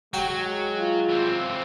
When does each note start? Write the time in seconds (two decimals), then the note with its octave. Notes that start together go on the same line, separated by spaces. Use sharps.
0.14 F#3 G#3 F#4 G5
0.78 F4
1.09 E3 C4